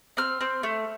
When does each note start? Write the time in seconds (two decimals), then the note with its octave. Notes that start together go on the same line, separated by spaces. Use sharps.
0.17 C4 F6
0.41 C4
0.63 A3